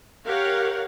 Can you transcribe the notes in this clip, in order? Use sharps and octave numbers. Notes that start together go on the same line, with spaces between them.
G4 A#4 C#5 F5 F#5